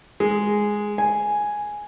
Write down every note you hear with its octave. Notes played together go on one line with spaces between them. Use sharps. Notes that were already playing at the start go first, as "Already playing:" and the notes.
G#3
G#5